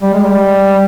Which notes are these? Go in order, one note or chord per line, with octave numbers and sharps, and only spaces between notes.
G3
G#3
G3